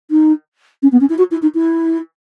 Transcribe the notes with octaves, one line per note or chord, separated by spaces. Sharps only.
D#4
C#4
B3
C#4
E4
F#4
E4
D#4
E4